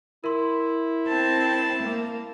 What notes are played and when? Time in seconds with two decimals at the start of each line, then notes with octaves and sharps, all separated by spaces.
0.24 E4 A#4 C6
1.08 C4 A5
1.82 A#3